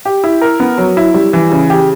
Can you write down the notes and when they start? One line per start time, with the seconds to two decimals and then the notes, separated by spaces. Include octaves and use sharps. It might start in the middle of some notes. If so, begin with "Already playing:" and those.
0.05 G4
0.24 E4
0.42 A#4
0.60 B3
0.78 F#3
0.97 E4
1.14 G3
1.33 E3
1.52 C#3
1.70 G4